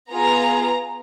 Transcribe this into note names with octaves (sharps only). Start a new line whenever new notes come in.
B3 F4 G#4 A#5